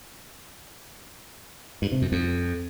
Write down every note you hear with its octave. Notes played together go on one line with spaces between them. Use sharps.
G2
C3
F#2
F2